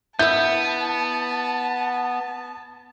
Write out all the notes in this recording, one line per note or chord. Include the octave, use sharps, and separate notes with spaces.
B3 E4 E5 A5 G6